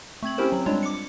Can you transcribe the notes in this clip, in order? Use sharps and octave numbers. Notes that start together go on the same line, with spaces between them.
A3 C4 G#6 F#7
C4 C#4 E4 G4 A#4 C5
F#3 C4
G3 G#3 C4 D4 F4 C#5
D6 C#7